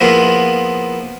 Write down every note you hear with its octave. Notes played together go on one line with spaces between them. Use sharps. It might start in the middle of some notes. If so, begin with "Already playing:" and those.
F3 A#3 B3 E4 F4 G#4